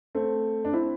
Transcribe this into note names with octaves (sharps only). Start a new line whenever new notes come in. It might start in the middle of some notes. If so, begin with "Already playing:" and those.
A3 C4
D4
C4 E4